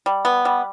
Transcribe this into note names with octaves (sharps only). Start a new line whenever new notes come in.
G3
B3
G3